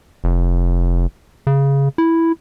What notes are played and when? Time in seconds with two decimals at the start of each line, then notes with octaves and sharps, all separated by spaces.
0.24 F1
1.47 C#3
1.98 E4